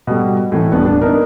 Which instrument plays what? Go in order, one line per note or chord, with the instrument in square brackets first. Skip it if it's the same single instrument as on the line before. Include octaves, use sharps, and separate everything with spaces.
[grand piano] B2 G3 A3
A2 E3 A3
D#1 B3 D4
D4
B3 D4 D#4 A#4